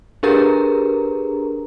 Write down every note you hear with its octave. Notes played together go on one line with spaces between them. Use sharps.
D4 G4 G#4 A#4 B4 A#5